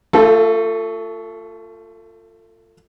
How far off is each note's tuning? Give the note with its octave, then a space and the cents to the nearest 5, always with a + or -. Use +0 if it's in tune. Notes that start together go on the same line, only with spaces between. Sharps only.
A3 +30 F4 +0 A4 -15